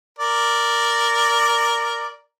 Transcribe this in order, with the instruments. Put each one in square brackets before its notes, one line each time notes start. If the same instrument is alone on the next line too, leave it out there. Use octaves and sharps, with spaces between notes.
[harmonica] A#4 D5